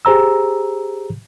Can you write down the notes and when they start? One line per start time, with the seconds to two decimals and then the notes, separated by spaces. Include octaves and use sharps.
0.05 G4 G#4 C5 A#5 E6